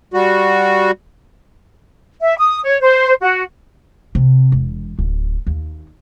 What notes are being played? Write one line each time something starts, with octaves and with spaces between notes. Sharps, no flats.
G3 F#4
E5
D#6
C#5
C5
F#4
C3
E1
D1
D#2